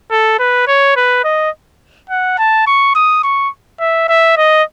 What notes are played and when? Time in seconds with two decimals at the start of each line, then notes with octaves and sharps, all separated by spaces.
0.11 A4
0.39 B4
0.67 C#5
0.96 B4
1.24 D#5
2.10 F#5
2.38 A5
2.67 C#6
2.95 D#6
3.23 C#6
3.80 E5
4.09 E5
4.37 D#5